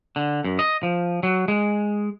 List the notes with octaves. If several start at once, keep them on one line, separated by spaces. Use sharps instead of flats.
D3
F#2
D#5
F3
F#3
G#3